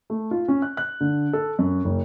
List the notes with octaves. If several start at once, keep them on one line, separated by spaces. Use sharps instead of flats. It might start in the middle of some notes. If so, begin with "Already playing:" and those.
A3
F4
C#4
F#6
F#6
D3
A4
F#2
F#1